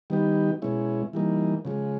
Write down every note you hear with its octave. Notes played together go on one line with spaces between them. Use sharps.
D#3 G3 B3 D#4 G4
B2 G#3 C#4 E4
E3 G3 A#3 D#4
C#3 F3 G#3